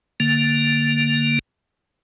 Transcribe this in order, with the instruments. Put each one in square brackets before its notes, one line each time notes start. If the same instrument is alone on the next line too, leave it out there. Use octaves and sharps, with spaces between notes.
[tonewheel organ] D3 A#3